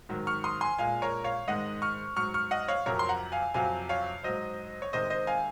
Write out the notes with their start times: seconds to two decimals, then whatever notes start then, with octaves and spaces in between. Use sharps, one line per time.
0.09 G#2 D#3 F#3
0.27 C#6 F6
0.44 C6 D#6
0.61 G#5 C6
0.79 A#2 G#3 F5 G#5
1.02 A#4 C#5
1.24 C#5 F5
1.48 G#2 D#3 G#3 D#5 F#5
1.82 C#6 F6
2.16 G#2 F#3 C#6 F6
2.34 C#6 F6
2.51 D#5 F#5
2.68 C#5 F5
2.86 F2 C3 F#3 A#4 C#5
2.99 C6
3.09 F#5 A#5
3.32 F5 G#5
3.54 F2 C3 F#3 F5 G#5
3.89 C#5 F5
4.23 G#2 F#3 C5 D#5
4.82 C#5
4.93 C3 D#3 G#3 C5 D#5
5.10 C5 D#5
5.27 F5 G#5